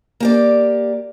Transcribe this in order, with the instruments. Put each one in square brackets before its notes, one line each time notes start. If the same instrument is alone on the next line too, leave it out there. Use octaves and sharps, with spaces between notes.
[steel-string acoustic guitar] A#3 G4 D5